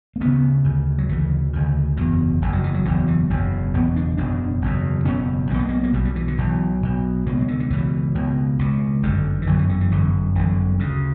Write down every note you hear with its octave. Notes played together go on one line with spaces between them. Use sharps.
A#3
D2 C#3 B3
D2 C#3
F#3
D2 C#3 E3
D2 C#3
F#1 E2 B2 F#3
F#1 E2 B2
F#3
E3
F#3
F#1 E2 B2 D3
E3
F#1 E2 B2
F#1 E2 B2 B3
D4
F#1 E2 B2 D4
F#1 E2 B2
F#1 E2 B2 C#4
B1 B2 A#3
B3
A#3
A#3
B1 B2 G3
G3
E3
D3
B1 B2 E3
B1 B2
C#2 B2 A#3
F#3
D3
D3
C#2 B2 E3
C#2 B2
C#2 B2
G1 F#2 D3
E3
G1 F#2 D3 F#3
E3
D3
E3
G1 F#2 D3 E3
G1 F#2 D3 E3
D2 C#3